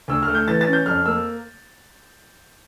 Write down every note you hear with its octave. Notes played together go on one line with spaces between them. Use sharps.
D2 E6
A3 F6
G6
E3 A6
A6
C#4
G6
F2 F6
A#3 E6